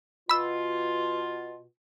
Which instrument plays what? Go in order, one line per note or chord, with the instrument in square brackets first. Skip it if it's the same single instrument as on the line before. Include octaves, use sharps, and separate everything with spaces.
[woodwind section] B2 F4 [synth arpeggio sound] B5 E6